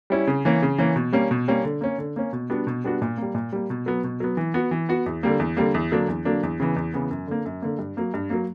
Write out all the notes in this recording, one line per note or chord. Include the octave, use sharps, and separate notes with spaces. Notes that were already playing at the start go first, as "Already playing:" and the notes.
G3 C#4 E4
C#3
E3 A#3 C#4
C#3
E3 A#3 C#4
B2
G3 A#3 C#4
B2
G3 A#3 C#4
D3
A#3 C#4
D3
A#3 C#4
B2
G3 B3 D4 F#4
B2
G3 B3 D4 F#4
A#2
G3 A#3
A#2
G3 A#3
B2
F#3 B3
B2
F#3 B3
E3
B3 F#4
E3
B3 F#4
E2
D3 G3 A#3
E2
D3 G3 A#3
E2
D3 F#3 A#3 D4
E2
D3 F#3 A#3 D4
E2
C#3 E3 B3
E2
C#3 E3 B3
F#2
D3 A#3
F#2
D3 A#3
G2
F#3 A#3
G2
F#3 A#3